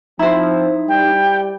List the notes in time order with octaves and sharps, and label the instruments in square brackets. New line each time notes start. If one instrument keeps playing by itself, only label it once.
[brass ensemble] F3 C4 [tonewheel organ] D#4 [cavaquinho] E4 C5
[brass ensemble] G3 [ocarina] G5